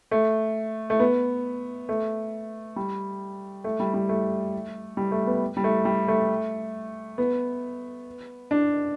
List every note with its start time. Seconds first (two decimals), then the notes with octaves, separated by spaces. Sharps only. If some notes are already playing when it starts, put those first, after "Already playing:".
0.11 A3
0.90 A3
1.00 B3
1.89 A3
2.76 G3
3.64 A3
3.80 G3
3.94 G3
4.09 A3
4.97 G3
5.12 A3
5.27 B3
5.57 G3
5.64 A3
5.85 G3
6.08 A3
7.18 B3
8.51 D4